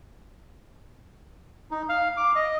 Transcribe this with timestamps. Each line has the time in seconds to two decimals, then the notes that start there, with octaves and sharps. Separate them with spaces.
1.71 D#4
1.89 F5
2.17 D6
2.36 D#5